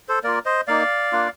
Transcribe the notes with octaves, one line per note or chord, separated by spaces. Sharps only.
A4 C5
A#3 F4 A#4 D5
C5 D#5
A#3 D#4 D5 F5
A#3 D4 F4